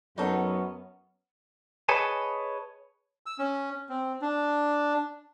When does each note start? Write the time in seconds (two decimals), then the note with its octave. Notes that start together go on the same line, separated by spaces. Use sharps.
0.18 F#2 F#3 B3 C#4 D#4 A4
1.89 G#4 B4 C#5 D#5 G#5 A5
3.26 E6
3.39 C#4
3.89 C4
4.22 D4